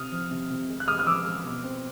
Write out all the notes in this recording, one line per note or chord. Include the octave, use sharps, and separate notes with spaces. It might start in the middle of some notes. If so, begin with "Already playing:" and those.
Already playing: C3 D#6 F6
F3
C3
C3
G#3
F#6
G#3 D#6 F6
F6
F3 D6 E6
G#3
B2
C4